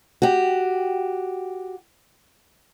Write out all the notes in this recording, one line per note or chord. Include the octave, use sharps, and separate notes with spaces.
F#4 G4